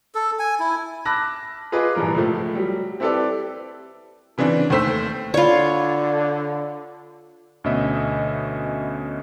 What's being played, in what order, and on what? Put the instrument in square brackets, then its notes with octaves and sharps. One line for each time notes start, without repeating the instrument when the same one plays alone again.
[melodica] A4
G#5
E4
[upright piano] A5 B5 D6 E6 F#6 A#6
F4 G#4 B4 D#5 B5 D6
D#1 G2 E3 F3 A#4
C#2 F3 A3
F#3 G3
C4 E4 G4 A4 B4 D5
[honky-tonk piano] C#3 E3 C4 D4
D#2 A3 C5 E6 B6
[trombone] D3 [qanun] F4 C#5 [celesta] D5 B5
[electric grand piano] D2 B2 C#4 D#5 E5